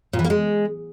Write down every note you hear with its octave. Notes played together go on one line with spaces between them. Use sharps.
A#2
E3
A#3
G#3